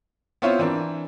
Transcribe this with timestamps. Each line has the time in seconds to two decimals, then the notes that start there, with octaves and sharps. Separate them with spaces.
0.42 B3 C4 E4 F4 C5 C#5
0.59 E3 C4 D4 A#4